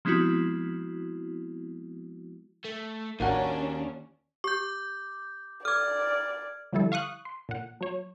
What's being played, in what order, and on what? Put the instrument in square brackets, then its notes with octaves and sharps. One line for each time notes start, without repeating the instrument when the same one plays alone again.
[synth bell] F3 G#3 B3 C4 E4 F#4
[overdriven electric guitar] A3
[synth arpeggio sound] A1 F#5 [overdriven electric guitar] D#2 [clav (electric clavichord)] A#3 F#4 A#4 [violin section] C#4 D4
[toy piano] G4 [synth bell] D6 G6
[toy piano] A4 D6 [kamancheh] D5 [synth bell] F6 G#6
[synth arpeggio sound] D3 F3 G3 E4 A4
F5 C#6 D#6 F#6
C6
A#2 F#5
F#3 C#5